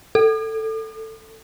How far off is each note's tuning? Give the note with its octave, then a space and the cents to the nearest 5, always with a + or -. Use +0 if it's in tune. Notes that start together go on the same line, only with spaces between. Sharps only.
A4 +10